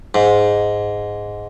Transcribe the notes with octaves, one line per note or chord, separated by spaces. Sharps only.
G#2